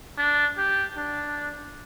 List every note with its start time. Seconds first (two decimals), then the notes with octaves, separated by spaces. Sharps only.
0.18 D4
0.58 G4
0.97 D4